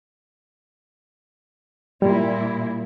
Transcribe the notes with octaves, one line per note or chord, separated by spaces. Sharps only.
A#2 G3 A#3 E4